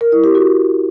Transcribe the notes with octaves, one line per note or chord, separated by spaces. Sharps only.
A#4
E4
G4
F#4